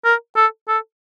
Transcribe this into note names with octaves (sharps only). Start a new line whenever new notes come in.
A#4
A4
A4